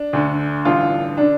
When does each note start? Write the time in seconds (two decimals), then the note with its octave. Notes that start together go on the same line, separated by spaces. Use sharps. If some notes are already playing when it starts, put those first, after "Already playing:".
Already playing: D4
0.13 D2 D3
0.65 A1 G2 D3 F4
1.17 D3 D4